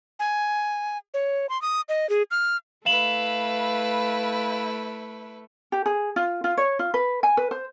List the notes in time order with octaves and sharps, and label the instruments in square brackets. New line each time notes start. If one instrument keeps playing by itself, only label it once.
[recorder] G#5
C#5
C6
D#6
D#5
G#4
F6
[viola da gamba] A3 [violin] E4 B4 [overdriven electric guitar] F5 [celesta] E7 F#7
[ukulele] G4
G#4
F4
F4
C#5
F4
B4
G#5
B4
C5